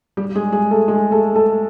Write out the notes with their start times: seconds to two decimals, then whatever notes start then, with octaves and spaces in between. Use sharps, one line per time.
0.17 G3 G4
0.35 G#3 G#4
0.52 G#3 G#4
0.71 A3 A4
0.88 G#3 G#4
1.11 A3 A4
1.35 A3 A4